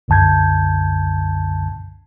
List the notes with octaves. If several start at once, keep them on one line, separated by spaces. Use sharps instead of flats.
C2 F#2 D3 A5 G6 G#6